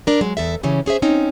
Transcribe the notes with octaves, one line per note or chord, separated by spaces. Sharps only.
D4 A#4
F#3 G#3
E2 A4 E5
C#3 E3 C#4 G4
C#4 G#4 C5 E5
C4 C#4 D#4